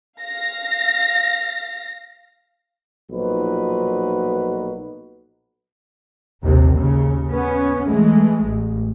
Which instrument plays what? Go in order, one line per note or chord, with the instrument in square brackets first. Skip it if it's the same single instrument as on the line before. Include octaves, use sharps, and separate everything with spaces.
[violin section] F5 A#6
[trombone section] B1 A#2 F3 D#4 F#4 B4
[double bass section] A#1 D#2 C3
D#2 C#3
B3 C#4
E3 G#3 A3
A1